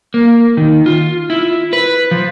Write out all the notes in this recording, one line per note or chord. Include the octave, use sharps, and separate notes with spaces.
A#3
D#3
F4
E4
B4
F3